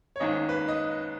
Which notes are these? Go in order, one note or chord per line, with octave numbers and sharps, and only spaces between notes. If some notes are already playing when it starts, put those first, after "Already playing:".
C#5
G#1 G#2 D#3 A#3 C#4 D#4 D#5
B4
D#5